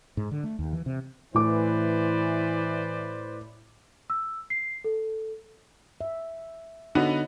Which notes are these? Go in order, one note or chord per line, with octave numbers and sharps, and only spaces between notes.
G#2
D3
A3
D#2
E3
C3
A2 E3 B4 C5 D5 D6
E6
C7
A4
E5
D3 B3 D#4 F#4 C#5 D#5